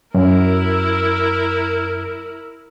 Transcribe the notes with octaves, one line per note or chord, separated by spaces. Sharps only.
F#2 E4 A#4